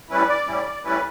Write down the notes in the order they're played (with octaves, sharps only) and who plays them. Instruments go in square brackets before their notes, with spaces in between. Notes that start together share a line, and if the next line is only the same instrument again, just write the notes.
[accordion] A2 G3 C#4 E4 B4
D5
A2 G3 C#4 E4
A2 G3 C#4 E4 B4